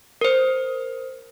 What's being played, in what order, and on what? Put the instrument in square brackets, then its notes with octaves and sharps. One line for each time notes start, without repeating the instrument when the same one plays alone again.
[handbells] A#4 C5